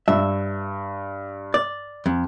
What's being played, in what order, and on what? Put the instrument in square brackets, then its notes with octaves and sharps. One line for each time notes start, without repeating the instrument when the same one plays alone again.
[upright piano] G2 [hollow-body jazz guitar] E5
[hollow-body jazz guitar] D5
F2